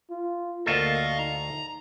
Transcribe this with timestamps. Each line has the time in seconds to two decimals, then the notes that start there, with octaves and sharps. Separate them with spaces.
0.10 F4
0.66 D2 A#3 F4 A4 D#5 F5 C#6
1.18 D#4 A#5